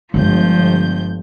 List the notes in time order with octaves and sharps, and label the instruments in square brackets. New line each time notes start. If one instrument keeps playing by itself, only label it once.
[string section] G1 G6 [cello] F3 [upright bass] G#3 B3